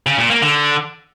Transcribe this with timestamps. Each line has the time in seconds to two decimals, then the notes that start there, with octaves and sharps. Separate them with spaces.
0.06 C#3
0.18 A#2
0.30 A#3
0.42 D3